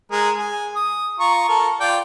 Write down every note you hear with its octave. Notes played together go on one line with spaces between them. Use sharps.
G#3 A#4
G#4
D#6
F4 A#5 C#6
A4 A#4
F4 D5 G5